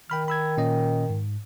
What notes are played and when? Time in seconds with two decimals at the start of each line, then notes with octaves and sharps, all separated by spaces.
0.10 D#3 G5 B5 F6
0.28 B5 E6 G#6
0.57 A#2 C#4 D#5
1.10 G#2